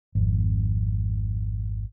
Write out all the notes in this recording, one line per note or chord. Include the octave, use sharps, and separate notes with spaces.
G#1 F2